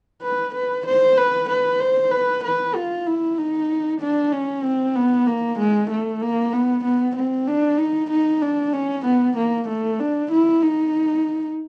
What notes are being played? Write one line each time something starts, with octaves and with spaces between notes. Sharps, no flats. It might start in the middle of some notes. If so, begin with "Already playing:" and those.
B4
B4
C5
B4
B4
C5
B4
B4
F4
E4
D#4
D4
C#4
C4
B3
A#3
G#3
A3
A#3
B3
B3
C4
D4
D#4
D#4
D4
C#4
B3
A#3
A3
D4
E4
D#4